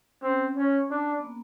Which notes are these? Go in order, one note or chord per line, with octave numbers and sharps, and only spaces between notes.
C4 C#4
C#4
D4
B3
A#3